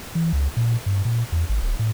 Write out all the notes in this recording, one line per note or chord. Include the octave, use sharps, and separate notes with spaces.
E3
C#2
A#2
G2
A#2
E2
G#1
D1
A2